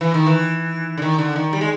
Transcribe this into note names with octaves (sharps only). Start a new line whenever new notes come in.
E3
D#3
E3
D3
D#3
D3
D#3
G3
G#3